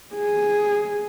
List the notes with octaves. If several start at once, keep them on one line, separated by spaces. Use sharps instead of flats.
G#4